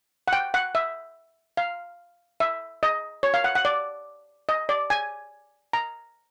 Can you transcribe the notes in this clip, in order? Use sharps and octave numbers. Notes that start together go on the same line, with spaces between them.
F#5
G5
F#5
E5
F5
E5
D#5
C#5
F5
F#5
F#5
D5
D#5
D5
G#5
A#5